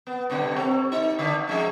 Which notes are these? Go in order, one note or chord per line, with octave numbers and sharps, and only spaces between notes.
B3
G2 B2 D3
C4 A4 C#5
G2 D#4
D3 D4
F3 G#3 C#4